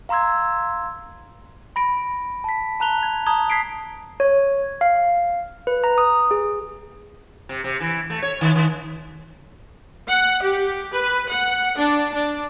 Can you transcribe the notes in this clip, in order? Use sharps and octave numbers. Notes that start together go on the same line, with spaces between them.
F5 A#5 C6 E6 G#6
B5 A#6 D7
A5 B6
A5 A#5 F#6 F7 G7
G#6
A5 A#5 D#6 G#6 G7
G#6 B6 C7 D7
C#5
F5
B4
A#5
D#6
G#4
C3
C3
E3
A3
C#5
D#3
D#3
F#5
G4
B4
F#5
D4
D4